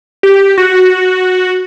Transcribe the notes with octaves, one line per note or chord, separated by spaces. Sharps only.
G4
F#4